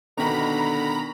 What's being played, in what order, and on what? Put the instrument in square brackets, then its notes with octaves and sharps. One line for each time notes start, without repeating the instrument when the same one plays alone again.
[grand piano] B2 D#3 [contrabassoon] D3 [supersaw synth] A#5 B5